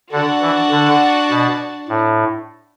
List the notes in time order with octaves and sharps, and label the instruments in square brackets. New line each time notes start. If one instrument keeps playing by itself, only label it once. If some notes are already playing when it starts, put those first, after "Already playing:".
[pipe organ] D3 [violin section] D4 F#4 D5 F#5 A5
[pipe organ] E3
D3
B2
A2